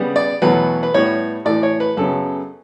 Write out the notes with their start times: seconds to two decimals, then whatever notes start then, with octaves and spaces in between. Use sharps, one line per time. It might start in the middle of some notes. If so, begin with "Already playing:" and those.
Already playing: C#3 G3 B3
0.16 D5
0.42 E2 B2 F#3 A3 B4
0.83 B4
0.94 A2 G3 B3 C#5
1.45 A2 E3 A3 D5
1.63 C#5
1.80 B4
1.97 F#2 C#3 F#3 B3 A4